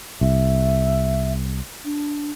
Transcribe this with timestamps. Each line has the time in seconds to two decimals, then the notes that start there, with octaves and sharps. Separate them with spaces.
0.21 C2 E5
1.84 D4